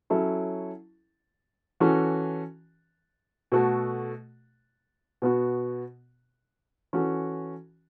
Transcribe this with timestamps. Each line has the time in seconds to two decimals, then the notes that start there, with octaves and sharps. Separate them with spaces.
0.10 F#3 C#4 E4 A4
1.80 E3 C#4 F#4 A4
3.52 B2 A3 F#4 A4
5.22 B2 B3 F#4
6.93 E3 C#4 F#4 A4